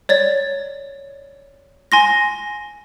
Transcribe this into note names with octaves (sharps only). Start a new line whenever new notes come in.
C#5 D5 A6
G#5 C6 A#6